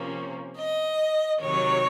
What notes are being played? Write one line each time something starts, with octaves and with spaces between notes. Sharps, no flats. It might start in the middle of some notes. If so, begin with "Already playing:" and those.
Already playing: C3 F3 A#3 C#4
D#5
C3 D#3 F#3 C#5